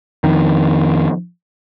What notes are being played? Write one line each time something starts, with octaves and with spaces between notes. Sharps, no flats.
F2 D#3